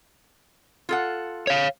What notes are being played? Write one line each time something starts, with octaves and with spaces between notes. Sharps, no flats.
F4 A4 F#5
C#5 F5